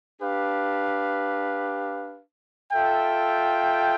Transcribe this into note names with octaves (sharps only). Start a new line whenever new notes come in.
D4 G4 B4 F5
F4 A4 E5 G5